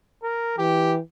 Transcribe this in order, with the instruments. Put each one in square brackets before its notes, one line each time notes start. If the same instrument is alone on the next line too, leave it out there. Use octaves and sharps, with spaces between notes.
[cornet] A#4
[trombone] E3 [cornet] G4